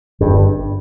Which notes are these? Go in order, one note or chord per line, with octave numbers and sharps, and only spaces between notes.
G1 G2